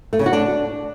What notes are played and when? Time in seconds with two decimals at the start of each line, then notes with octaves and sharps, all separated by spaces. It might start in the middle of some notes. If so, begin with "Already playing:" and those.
0.13 A3
0.19 C#3
0.26 F#4
0.33 D4